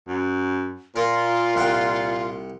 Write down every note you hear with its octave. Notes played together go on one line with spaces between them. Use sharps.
F#2
A#2 F4 A#4
C2 F#5 G5